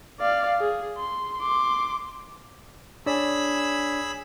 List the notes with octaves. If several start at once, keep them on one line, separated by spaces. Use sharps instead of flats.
D5 F5
G#4
C6
C6 D6
D4 G#4 C#5 D5 B5 E6